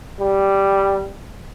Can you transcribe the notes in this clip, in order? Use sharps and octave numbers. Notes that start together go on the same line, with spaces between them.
G3